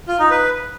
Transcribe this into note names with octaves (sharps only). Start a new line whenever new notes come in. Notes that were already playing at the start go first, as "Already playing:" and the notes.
F4
D#4
B4